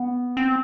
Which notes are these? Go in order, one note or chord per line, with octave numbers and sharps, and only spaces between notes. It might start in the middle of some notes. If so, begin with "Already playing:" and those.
Already playing: B3
C4